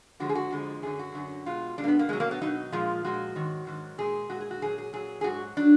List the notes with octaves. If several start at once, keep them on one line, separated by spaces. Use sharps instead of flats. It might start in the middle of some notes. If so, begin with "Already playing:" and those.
F2 D3 F3 G#3 F#4
G#4
F#4
F2 D3 F3 G#3
F#2 D3 F#3 G#4
F#4
F#2 D3 F#3
B2 G#3 F4
B2 G#3 D4
A#3
B3
A#3
B2 F#3 G#3
A#3
B3
B2 F#3 D#4
A#2 F3 G#3 F4
A#2 F3 G#3 F#4
G#2 D#3 F#3
G#2 D#3 F#3
A#2 G#3 G#4
A#2 G#3 F#4
G#4
F#4
A#2 F#3 G#4
G#4
A#2 F#3 G#4
G#4
G#2 F#3 F#4
F#3 D4